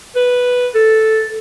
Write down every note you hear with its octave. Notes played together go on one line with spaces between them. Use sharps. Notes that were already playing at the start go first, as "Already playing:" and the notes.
B4
A4